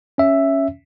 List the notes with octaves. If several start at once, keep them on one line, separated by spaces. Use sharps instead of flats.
C#4 E5